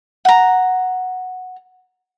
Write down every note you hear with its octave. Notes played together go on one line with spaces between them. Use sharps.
F#5 A#5